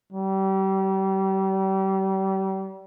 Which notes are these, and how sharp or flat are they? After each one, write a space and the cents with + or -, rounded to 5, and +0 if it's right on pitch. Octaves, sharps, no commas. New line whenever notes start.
G3 -35